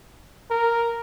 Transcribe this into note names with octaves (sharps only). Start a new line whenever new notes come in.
A#4